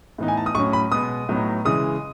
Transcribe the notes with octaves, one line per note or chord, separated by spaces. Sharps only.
A2 E3 B3 D#4
G#5
A5
D#6
A2 F#3 C#4 C#6
B5
B2 G#3 B3 D#6
A2 F#3 B3 D#4
C#3 E3 G#3 D#6